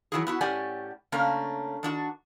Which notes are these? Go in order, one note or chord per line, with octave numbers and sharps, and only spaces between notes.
E3 F#3 G#3 E4 F#4 G#4
B3 E4 F#4
A2 C#4 G4 D5 F#5 G#5
C#3 A3 A#3 C#4 D4
D#3 D4 F#4